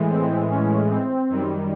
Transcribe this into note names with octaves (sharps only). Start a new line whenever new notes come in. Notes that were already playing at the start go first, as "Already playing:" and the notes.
Already playing: A2 E3 G#3
C4
C#4
C4
F#2 D#3 G3